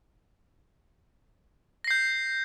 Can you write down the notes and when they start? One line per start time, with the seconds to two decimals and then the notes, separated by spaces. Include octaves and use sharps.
1.84 A#6
1.87 C7
1.91 G6